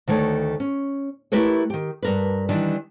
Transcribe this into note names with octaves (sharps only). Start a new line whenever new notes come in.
D2 D#3 A3 C#5
C#4
A3 E4 G4 A#4 B4 C#5
D#3 G4
G2 A#4 B4
D#3 E3 G3 D4